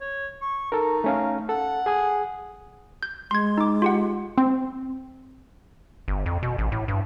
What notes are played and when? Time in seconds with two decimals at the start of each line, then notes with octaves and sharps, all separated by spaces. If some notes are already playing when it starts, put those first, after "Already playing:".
0.01 C#5
0.42 C#6
0.72 D#4 A4 A#4
1.04 A3 C#4 F5
1.49 A4 F#5
1.86 G#4 G#5 D#6
3.03 G6
3.31 G#3 C6 G#6
3.58 D#4 D6
3.82 F4 G4 F#5
4.38 C4
6.08 G1
6.26 F2
6.43 B2
6.58 A1
6.72 A2
6.88 G2